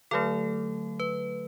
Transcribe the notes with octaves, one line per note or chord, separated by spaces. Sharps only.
D3 F#3 A3 A4
B4